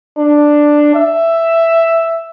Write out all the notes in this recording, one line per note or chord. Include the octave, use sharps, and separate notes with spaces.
D4
E5